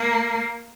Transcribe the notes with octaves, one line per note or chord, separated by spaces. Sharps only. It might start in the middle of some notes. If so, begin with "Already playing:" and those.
Already playing: A#3